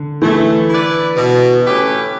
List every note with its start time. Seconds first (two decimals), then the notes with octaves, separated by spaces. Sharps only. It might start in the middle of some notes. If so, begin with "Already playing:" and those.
Already playing: D3
0.21 E3 A3
0.69 E4 B4 D5
1.16 B2
1.64 A3 C#4 G4 B4